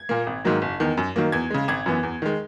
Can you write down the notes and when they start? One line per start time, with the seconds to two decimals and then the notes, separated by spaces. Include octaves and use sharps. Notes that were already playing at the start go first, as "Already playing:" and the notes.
Already playing: G#6
0.09 A#2 A#3
0.27 G#1
0.44 G#2 D#3 F#3 A#3
0.62 F#1
0.80 E2 D#3
0.97 F#2
1.16 D#3 F#3 A#3
1.32 E2 G#6
1.50 C#3 G#3
1.68 G#1 G#6
1.86 F#2 E3 B3
2.03 E2
2.22 D#3 G#3